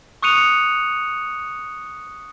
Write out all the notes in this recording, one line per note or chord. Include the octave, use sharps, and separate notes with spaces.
C#6 D#6 F#6 C#7 D#7 F7